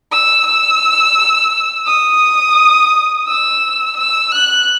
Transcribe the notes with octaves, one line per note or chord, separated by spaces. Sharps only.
E6
E6
D#6
E6
E6
F#6